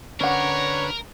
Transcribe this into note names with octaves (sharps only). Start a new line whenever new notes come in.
D3 C#4 D4 A#4 B4 C#5 F#5